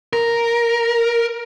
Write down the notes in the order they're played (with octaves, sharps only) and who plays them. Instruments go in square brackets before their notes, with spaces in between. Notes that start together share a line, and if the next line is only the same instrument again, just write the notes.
[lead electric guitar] A#4